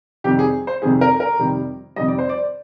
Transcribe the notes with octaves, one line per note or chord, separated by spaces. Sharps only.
F2 C3 D#3 G3 G4
G#4
C5
F2 C3 D#3 G3 G#4
A#4
A#4
F2 C3 D#3 G3
F2 C3 D#3 G3 D#5
D5
C5
D5